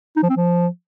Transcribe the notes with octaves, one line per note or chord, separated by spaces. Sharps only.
D#4
F3
C4
F3